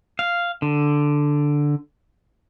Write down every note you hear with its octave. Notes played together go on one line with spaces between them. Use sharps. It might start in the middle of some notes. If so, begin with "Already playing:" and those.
F5
D3